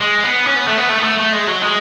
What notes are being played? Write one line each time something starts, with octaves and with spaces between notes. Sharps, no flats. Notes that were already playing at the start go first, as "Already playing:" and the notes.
G#3
B3
C#4
B3
A3
B3
A3
B3
A3
A3
G#3
F#3
G#3